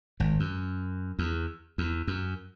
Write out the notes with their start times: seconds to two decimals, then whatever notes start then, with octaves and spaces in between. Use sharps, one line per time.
0.20 G#1 G#2
0.40 F#2
1.19 E2
1.78 E2
2.07 F#2